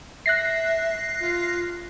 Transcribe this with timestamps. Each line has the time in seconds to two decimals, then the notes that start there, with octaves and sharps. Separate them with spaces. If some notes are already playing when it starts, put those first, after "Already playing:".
0.26 E5 F#6 A#6 C7
1.20 F4